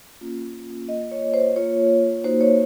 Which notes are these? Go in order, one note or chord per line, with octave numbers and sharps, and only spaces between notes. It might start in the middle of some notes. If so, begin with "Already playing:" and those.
A#3 C#4 F4
A#3 F4 D#5
C#5
C5
A#3 F4 C#5
A#3 D#4 F#4 C5
C#5